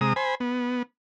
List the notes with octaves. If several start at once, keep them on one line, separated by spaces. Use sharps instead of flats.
C3 G#3 A#5 D#6
C5 G#5 B5
B3